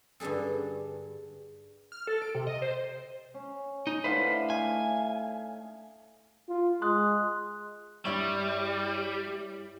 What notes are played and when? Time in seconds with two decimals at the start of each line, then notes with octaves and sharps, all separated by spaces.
0.20 G2 D3 G3 G#4 A4
1.92 F6
2.07 A4
2.22 D7
2.35 C3
2.47 D#5
2.62 C5
3.34 C#4
3.87 D#4
4.04 A2 D3 B4 C5 F5
4.50 A3 D#4 F5 G#5
6.49 F4
6.82 G#3 C6 D#6 F#6
8.05 G2 G3 E4 C#5